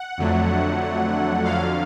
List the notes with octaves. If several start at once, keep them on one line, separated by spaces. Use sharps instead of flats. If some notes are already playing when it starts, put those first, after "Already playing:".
Already playing: F#5
F2 D3 F#3 A3
F2 D3 F#3 F5